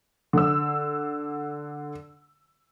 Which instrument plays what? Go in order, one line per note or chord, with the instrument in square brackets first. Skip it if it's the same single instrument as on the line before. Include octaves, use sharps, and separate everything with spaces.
[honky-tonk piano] D3 E6